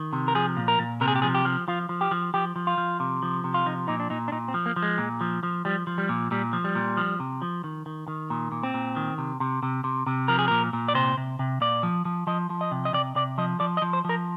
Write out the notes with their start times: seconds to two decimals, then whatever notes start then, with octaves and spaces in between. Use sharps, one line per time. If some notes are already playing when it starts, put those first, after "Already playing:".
Already playing: D#3
0.13 C3
0.28 A#4
0.35 F3 G#4
0.57 A#2
0.68 A#4
0.79 A#2
1.01 C3 A#4
1.08 G#4
1.15 G4
1.22 F3 G#4
1.34 G4
1.45 F3
1.68 F3 F4
1.89 F3
2.01 G4
2.11 F3
2.34 F3 G4
2.56 F3
2.67 F4
2.78 F3
3.00 C3
3.23 F3
3.44 C3
3.54 F4
3.66 F3 D#4
3.88 A#2 D#4
4.00 D4
4.10 A#2 D#4
4.28 D4
4.32 A#2 D#4
4.48 C4
4.54 F3
4.66 A#3
4.76 F3
4.83 G#3
4.98 A#2
5.21 F3
5.43 F3
5.65 F3 G3
5.87 F3
5.98 G3
6.09 A#2
6.31 A#2 G3
6.53 F3
6.64 G3
6.75 A#2
6.97 F3
7.20 C3
7.42 F3
7.64 D#3
7.86 D#3
8.08 D#3
8.30 A#2
8.52 A#2
8.63 C4
8.74 A#2
8.96 D#3
9.18 C3
9.40 C3
9.63 C3
9.84 C3
10.07 C3
10.28 F3 A#4
10.39 G#4
10.48 A#2 A#4
10.73 A#2
10.88 D5
10.95 C3 C5
11.17 C3
11.39 C3
11.61 A#2 D5
11.83 F3
12.05 F3
12.27 F3 D#5
12.50 F3
12.61 D#5
12.71 C3
12.85 D#5
12.93 C3 D5
13.16 C3 D5
13.38 F3 D#5
13.60 F3 D5
13.77 D#5
13.82 F3
13.93 C5
14.05 F3 A#4